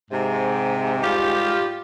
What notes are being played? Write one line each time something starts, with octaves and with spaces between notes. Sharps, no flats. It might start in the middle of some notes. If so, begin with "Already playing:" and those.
G#2 C3
G3 F4 G4